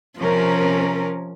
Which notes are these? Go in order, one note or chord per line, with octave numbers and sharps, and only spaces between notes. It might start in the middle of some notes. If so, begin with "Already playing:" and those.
C3 F3 C#4 A#4